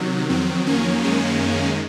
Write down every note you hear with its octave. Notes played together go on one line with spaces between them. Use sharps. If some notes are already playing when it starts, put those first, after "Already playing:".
Already playing: C3 D#3 F#3
F2 D#3 F#3 C4
A#3 C#4
F#2 D#3 G#3